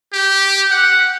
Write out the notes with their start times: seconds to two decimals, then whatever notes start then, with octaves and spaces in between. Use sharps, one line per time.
0.13 G4
0.71 F#5